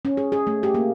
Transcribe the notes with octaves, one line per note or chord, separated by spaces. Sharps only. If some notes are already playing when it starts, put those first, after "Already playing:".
C#4
G#4
G#4
A3
G4
A#3